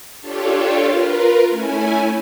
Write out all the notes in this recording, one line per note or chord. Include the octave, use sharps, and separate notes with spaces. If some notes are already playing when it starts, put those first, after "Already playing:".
D4 F4 G4 A4 C#5
F4 A#4 B4
A3 C#4 E4 G#5